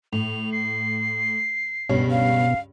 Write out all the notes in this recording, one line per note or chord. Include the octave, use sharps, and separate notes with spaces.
A2 F7
C7
C#2 G2 B2 B3 C#5
F5